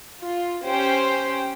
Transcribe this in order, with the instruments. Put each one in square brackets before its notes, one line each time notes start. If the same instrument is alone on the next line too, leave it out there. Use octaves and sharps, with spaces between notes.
[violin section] F4
C#4 G4 C5 G5